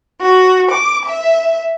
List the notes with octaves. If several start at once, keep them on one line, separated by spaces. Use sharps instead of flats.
F#4
D6
E5